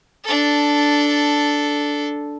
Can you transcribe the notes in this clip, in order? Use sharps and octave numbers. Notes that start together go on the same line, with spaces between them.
D4 A4